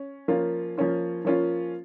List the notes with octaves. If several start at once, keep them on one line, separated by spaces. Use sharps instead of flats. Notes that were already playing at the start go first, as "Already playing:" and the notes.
Already playing: C#4
F3 A#3 C#4 F4
F3 A#3 C#4 F4
F3 A#3 C#4 F4